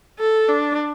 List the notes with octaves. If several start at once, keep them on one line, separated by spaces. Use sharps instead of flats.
A4
D4